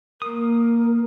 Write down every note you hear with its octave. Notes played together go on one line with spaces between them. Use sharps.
A#3 A#4 D#6